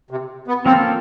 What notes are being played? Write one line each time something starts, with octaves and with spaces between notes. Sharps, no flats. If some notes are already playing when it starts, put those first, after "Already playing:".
C3
B3
F3 A#3 C4 C#4 F4 A4